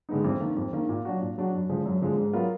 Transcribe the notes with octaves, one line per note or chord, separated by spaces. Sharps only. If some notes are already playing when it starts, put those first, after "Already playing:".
D3 G#3 B3 D#4
F2
D#3 A#3
F2
D#3 A#3
A#2
F#3 D4 F#4
A#2
F#3 D4 F#4
F#2
D3 F3 G#3
F#2
D3 F3 G#3
G#2
F#3 B3 F4 A#4